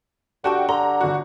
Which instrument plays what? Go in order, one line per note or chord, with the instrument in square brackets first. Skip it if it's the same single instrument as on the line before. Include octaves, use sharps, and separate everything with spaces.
[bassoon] D3 [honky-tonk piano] F#4 G5 [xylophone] G4 A5 C#6
[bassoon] D3 [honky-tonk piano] A#5 [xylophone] C6
[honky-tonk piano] G1 F#4